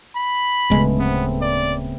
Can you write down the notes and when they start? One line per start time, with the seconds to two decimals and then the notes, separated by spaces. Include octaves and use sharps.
0.16 B5
0.70 D1 C#3 G#3 A3 B3
0.99 B3 C4
1.41 D5